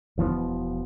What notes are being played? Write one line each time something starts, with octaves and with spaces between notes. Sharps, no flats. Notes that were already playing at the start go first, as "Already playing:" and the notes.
E1 E3 F3 B3